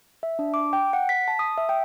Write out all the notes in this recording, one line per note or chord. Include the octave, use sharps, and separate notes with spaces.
E5
D4
D6
G5
F#5
B6
A5
D#6
E5
G5